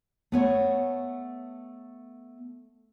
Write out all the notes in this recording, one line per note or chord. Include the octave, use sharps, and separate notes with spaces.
A3 B3 C#5